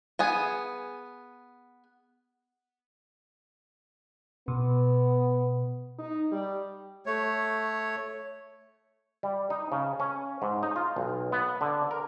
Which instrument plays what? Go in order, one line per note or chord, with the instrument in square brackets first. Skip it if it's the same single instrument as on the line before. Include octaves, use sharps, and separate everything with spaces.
[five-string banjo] B3 G#4 G#5
[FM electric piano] B2 [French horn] B3
[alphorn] D#4
G3
[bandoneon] A3 C#5
[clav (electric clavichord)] G3
D#4
C#3
C#4
G#2
D#4
F4
B1
B3
D3
A#4